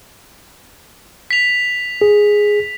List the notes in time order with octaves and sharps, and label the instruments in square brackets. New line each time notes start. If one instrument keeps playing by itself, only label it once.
[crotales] B6 F7
[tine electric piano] G#4